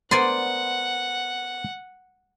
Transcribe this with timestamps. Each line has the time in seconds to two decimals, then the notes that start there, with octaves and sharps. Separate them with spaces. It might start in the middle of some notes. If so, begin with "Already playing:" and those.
0.11 B3 A#4 C5 D5 F#5 G#5 C6